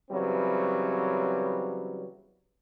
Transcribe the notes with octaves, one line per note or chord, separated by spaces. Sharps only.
C#3 E3 F#3 G3 B3 C4